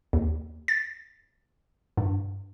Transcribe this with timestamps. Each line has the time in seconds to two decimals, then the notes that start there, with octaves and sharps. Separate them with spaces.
0.13 D#2
0.68 A6
1.97 G2